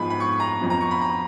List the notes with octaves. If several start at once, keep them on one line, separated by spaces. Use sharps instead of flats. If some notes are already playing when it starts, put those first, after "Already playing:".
Already playing: G#2 F3 B3 B5
B5
C#6
A#5
F2 F3 B3
A#5
C#6
B5
A#5